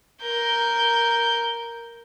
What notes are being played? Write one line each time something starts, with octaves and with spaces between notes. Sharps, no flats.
A#4 G6